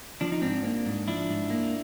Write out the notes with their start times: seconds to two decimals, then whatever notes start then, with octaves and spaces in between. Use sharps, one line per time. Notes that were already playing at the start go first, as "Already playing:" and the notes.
0.21 F3 D4
0.32 D#4
0.42 G#2 C4 D4
0.64 A#3
0.86 G#2
1.08 F3 D4 E4
1.30 G#2
1.50 A#3